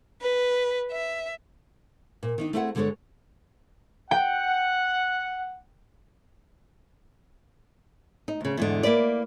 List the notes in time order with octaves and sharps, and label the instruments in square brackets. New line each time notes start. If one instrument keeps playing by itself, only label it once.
[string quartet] B4
E5
[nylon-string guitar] A#2
D#3 D4 D#4
A3 C4 E4 G#4 D5 F#5
G2 D3 G#3 D4 A4 C#5
[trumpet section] F#5 [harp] G5
[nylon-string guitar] D#4
D2 C#3
E2 G#2 D3
A#3 E4 B4 D5